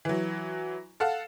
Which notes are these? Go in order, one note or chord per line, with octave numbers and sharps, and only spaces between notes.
E3 F#3
A4 F5 F#5